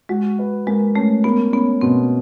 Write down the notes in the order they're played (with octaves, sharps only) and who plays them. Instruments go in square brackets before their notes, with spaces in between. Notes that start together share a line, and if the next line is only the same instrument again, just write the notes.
[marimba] G#3 [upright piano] F#4
[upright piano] B4
[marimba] G#3 [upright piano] A#3
[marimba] A3 [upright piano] C#4
[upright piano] A#3 [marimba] B3
[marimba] B3 [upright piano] C#4
[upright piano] B2 [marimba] C4